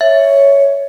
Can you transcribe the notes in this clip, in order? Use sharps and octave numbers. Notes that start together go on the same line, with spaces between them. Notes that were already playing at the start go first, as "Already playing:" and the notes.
C#5 E5